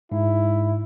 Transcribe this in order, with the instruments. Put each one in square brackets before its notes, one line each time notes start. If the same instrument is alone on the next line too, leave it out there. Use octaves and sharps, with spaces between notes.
[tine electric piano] G#2 [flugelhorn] E4